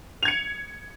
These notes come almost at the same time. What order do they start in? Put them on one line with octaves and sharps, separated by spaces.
F7 G#6 C#7